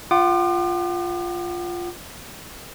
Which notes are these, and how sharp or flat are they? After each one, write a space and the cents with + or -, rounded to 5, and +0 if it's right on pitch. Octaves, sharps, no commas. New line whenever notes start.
F4 +0 F#5 +40 D6 +40